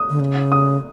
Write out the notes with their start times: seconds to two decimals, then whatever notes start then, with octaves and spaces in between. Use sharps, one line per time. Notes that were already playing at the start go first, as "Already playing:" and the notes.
Already playing: D#6
0.10 D3
0.20 C#3
0.52 D#6